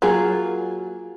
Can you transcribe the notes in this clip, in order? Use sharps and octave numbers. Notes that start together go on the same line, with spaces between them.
F#3 A#3 F4 G#4